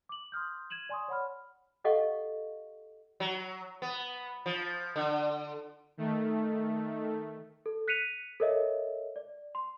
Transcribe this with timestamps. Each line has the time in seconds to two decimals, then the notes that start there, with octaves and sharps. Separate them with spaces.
0.09 D6 F#7
0.32 C6 D#6 F6 G6
0.70 G#6 D#7 E7 F#7
0.89 D5 G#5 C6 C#6 D#6
1.08 C#5 F#5 B5 F6
1.84 G4 A4 D#5 F5 F#5 C#6
3.20 F#3
3.82 B3
4.46 F3
4.96 D3
5.97 D#3 A3
7.66 A4
7.88 F#6 B6 C#7 D#7 F7
8.40 A4 A#4 C#5 D#5 E5
9.16 D5
9.55 C6